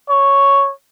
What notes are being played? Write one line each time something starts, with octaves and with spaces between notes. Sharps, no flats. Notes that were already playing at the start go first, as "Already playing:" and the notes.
C#5